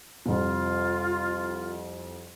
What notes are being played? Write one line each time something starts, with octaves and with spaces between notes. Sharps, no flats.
C2 F2 F4